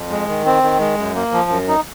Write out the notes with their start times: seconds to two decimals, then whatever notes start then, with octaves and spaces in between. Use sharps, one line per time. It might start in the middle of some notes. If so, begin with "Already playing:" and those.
Already playing: F2
0.10 G#3
0.28 D#3
0.46 C4
0.63 D#3
0.80 G#3
0.98 F#2
1.15 A#3
1.33 F3
1.50 F#2
1.68 D#4